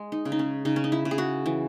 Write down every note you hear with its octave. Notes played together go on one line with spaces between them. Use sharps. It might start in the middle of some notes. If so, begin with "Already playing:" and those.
Already playing: G#3
D#4
C#3
D#4
C#4
C#3 D#4
C#4
D#4
E4
C#3
G#4
F#4
E3